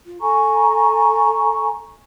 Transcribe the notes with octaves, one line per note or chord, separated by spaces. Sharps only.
F4
A4 G#5 A#5 C#6